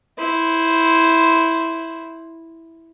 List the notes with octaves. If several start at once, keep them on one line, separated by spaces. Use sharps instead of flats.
E4 C5